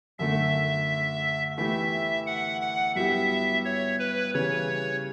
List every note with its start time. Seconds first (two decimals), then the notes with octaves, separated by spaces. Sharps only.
0.19 F#2 D3 F#3 A3 E5
1.57 E3 A3 E4 G4 E5
2.26 F#5
2.61 F#5
2.95 G2 F#3 B3 E4 G4 E5
3.65 C#5
3.99 B4
4.34 C#3 E3 G3 C#5